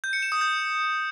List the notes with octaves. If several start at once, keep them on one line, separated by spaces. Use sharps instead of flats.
G6
C#7
E7
D#6
G6